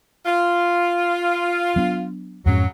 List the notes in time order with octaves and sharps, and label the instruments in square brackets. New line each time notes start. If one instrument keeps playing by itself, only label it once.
[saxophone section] F4
[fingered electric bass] F#3 B3 D4
[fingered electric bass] F2 G#2 C#4 [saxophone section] C#3 F#3